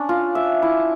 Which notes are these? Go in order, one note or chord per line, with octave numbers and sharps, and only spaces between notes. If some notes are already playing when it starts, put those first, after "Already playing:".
Already playing: C#4 D4
F4
E5
E4